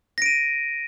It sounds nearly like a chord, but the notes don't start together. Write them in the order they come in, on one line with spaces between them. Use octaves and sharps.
A#6 D7 D#7